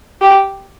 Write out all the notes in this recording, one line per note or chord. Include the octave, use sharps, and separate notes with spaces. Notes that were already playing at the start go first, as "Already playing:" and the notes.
G4